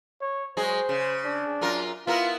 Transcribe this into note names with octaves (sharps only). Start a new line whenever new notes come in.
C#5
F#3 G#3 G#4 C5
C#3
D4
F#2 F4 A#4
B3 E4 F4 A#4